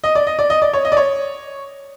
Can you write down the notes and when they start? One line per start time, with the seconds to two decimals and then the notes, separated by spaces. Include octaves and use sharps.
0.04 D#5
0.15 D5
0.27 D#5
0.39 D5
0.50 D#5
0.62 D5
0.73 C#5
0.85 D#5
0.92 D5
0.97 C#5